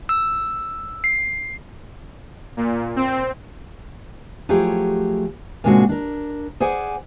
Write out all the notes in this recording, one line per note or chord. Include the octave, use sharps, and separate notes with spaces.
E6
C7
A#2
C4
F3 F#3 A3 G4 G#4
A#2 C#3 G#3 C4 D4 F#4
D4 A#4
G#4 C5 D5 F#5 G#5